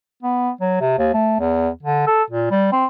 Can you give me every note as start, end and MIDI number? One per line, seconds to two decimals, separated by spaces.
0.23 0.50 59
0.61 0.79 54
0.81 0.98 48
0.98 1.13 39
1.14 1.36 57
1.40 1.69 40
1.83 2.07 50
2.07 2.23 69
2.30 2.51 46
2.51 2.67 55
2.72 2.86 60